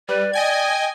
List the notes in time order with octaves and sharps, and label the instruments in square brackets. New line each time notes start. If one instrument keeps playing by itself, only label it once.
[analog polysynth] G3 [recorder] B4 [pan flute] D5
[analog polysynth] D#5 G#5 G#6 [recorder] G5